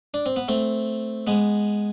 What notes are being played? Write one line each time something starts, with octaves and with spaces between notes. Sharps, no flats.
D4
C4
B3
A3 C4
G#3 B3